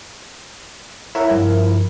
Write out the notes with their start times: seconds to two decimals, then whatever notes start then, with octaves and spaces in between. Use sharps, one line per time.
1.15 E4 A#4 C#5 E5 F#5
1.29 G2 F3 F4